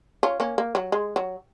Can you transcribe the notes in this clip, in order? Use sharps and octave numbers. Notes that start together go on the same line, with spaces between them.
C#4 F4
A#3 C#4
A#3
F#3
G#3
F#3